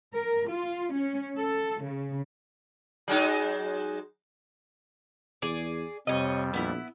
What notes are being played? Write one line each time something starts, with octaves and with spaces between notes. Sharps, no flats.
A#4
F4
C#4
A4
C#3
F#3 G#3 D#4
E2 G#4 D5
F2 C3 G3 C#5 D#5
A#1 B3 E4